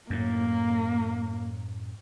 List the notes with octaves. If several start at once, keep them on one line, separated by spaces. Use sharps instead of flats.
F#2 A2 A#3